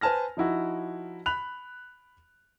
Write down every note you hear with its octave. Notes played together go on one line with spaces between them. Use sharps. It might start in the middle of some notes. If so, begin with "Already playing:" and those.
B4 C5 G#5 A5 F6 A#6
F3 D#4 E4 F#4
B5 F#6 F7